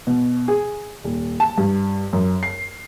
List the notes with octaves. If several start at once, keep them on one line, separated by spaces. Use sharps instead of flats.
B2
G#4
D#1
A5
G2
F#2
C7